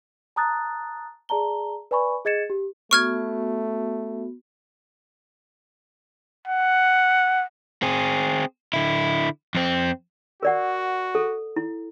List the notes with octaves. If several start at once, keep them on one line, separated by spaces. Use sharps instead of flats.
A5 A#5 D#6 F#6 A6
G#4 D5 A5 A#5 G7
B4 D5 G#5 B5 C#6
G#4 D#5 G#6 A6 C#7 E7
G4
A3 B3 F#4 C#6 F6 G#6
F#5
C4 G#4
D3 E4
F2 C4
F#4 A#4 D5 F#5
A4
E4